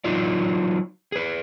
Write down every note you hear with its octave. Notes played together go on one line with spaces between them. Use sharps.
F#3 D#4 F4 D5
G#4 B4